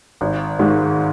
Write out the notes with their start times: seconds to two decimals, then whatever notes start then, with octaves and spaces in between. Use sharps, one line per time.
0.21 G#1
0.59 G#2 D#3 G#3